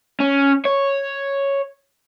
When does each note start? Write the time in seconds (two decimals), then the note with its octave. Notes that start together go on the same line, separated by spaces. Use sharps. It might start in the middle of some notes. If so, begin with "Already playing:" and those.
0.20 C#4
0.65 C#5